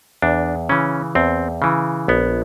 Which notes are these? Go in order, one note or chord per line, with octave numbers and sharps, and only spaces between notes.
E2 D4
C#3 E3 C#4
E2 C4
C#3 E3
A#1 B3